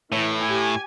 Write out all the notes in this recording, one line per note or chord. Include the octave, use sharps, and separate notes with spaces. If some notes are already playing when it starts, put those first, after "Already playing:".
A2 E3
G4 G#5